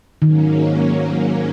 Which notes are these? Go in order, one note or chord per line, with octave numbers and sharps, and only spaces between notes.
G#2 D#3 F#3 A#3 C#4